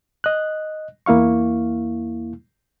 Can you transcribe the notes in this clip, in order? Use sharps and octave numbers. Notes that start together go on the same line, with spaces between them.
D#5 F#6
E2 A#3 E4 F5 C#6